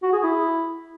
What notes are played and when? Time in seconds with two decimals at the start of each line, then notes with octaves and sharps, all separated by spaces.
0.03 F#4
0.13 G#4
0.23 E4